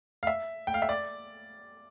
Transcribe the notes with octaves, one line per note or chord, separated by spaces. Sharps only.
F5
E5
G5
F5
E5
D5